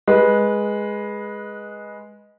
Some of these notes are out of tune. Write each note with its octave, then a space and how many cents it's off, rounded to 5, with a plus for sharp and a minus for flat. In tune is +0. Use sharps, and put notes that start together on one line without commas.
G#3 +0 B4 -15